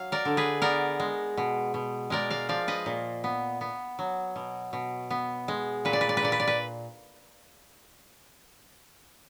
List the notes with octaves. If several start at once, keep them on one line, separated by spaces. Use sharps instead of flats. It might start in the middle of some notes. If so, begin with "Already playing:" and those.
Already playing: F#3 F5
A#4 D5
D3
G#4 B4
B3 A#4 D5
G#3
B2
B2
G#3 A#4 D5
D5 F5
F3 D5 F5
B4 D#5
A#2
B3
B3
F#3
B2
B2
B3
G#3
A#2 B4
D5
B4
D5
B4
A#2 D5
B4
D5
B4